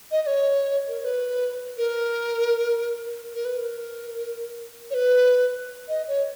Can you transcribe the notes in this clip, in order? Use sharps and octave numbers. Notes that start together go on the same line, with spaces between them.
D#5
D#5
C#5
A#4
C#5
B4
A#4
A#4
B4
A#4
C#5
B4
D#5
C#5